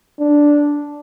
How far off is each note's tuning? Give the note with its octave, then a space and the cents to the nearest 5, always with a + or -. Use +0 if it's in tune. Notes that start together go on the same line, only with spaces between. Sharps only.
D4 -5